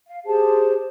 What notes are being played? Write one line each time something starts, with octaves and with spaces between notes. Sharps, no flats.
F5
G4 G#4 C5 A5